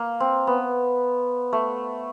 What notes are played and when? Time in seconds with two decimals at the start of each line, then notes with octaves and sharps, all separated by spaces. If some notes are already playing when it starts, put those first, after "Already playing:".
Already playing: A#3
0.20 C4
0.47 B3
1.53 A3